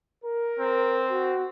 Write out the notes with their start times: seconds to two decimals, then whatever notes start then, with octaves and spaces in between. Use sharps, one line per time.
0.25 A#4
0.59 C4
1.11 F#4